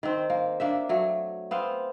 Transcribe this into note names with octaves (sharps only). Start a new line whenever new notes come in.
D#3 C4
A#3
A#3 D4 E5
F#3 A3
B3 C4 F5